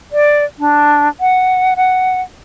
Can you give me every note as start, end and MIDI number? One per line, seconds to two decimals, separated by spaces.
0.12 0.44 74
0.59 1.08 62
1.20 1.74 78
1.76 2.21 78